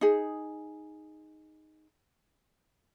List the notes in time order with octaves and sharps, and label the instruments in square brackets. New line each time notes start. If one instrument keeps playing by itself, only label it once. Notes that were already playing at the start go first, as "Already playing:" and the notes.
[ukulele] D#4 G#4